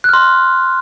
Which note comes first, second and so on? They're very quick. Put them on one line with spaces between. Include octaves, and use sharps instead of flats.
F#6 F6 C6